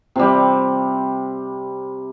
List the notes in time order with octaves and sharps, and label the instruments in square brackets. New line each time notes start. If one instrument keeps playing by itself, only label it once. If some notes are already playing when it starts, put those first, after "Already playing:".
[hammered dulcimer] C3 G3